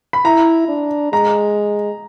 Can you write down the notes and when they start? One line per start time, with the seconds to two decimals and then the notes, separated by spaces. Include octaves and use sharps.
0.13 B5
0.25 E4 A#5
0.69 D4
1.13 G#3 A#5